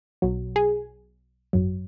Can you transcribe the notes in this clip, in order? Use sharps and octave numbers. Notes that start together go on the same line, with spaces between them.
B1 B2 F#3
G#4
G#1 F#2 F#3